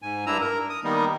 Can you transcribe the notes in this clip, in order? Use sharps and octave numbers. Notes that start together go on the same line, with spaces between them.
G#2 G#5
G2 D4 E4 A#5 E6
A#4
D#6
D#3 G3 A#3 B3 D#4